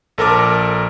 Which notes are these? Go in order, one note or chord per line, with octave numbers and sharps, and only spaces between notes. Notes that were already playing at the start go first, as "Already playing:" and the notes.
A#1 A4 A#4 A5 D6